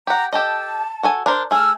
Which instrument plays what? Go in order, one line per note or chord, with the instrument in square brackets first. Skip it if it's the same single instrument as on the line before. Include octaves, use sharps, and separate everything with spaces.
[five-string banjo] G4 F#5 [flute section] A#5
[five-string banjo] G4 A4 D#5 [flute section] A5
[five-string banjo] F#4 A4 G#5
D4 A#4 C5
[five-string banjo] A3 G#4 [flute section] E6 F6